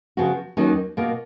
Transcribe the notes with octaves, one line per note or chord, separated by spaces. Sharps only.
C#3 F3 B3 F#4
D#2 D#3 F#3 A#3 C#4
B2 A#3 F4